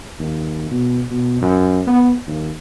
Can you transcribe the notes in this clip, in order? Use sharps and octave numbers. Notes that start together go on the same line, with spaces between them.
D#2
B2
B2
F#2
B3
D#2